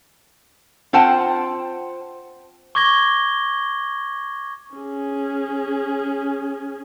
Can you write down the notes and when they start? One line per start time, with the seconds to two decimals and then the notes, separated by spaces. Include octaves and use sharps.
0.93 C4 F4 C5 F#5 G5 A5
2.75 C#6 D6 G#6 A#6 G7
4.76 C#4 G#4